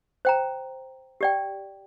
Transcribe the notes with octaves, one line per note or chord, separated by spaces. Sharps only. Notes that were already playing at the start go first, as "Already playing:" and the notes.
C5 G5 A#5
G4 D5 G5